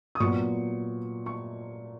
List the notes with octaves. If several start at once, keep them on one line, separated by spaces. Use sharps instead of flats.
D#6
A#2 F#3 B3 C#6
C#6